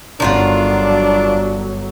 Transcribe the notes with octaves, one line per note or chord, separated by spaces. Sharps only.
G1 D#3 F#3 D4 F4 F#5